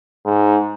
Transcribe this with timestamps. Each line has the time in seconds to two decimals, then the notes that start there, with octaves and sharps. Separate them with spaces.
0.25 G#2